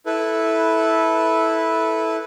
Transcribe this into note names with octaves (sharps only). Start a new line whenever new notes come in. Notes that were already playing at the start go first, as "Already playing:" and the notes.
E4 A4 B4